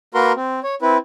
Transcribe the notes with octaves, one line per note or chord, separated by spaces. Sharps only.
A#3 F#4 A#4 B4 A#5 C6
C4
C#5
C4 E4 B4